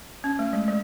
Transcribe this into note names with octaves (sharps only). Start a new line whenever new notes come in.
C#4
A3
G#3
G#3